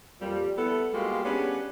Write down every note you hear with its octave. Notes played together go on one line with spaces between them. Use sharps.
F2 A#2 G3
B3 E4 A4
G3 G#3 A#3 F4 F#4
B3 C#4 D4 G4 G#4 B4